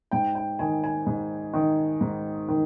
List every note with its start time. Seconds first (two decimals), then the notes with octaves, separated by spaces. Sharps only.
0.11 G#2 G5
0.35 G5
0.59 D#3 G#5
0.84 G#5
1.07 G#2
1.54 D#3
2.01 G#2
2.48 D#3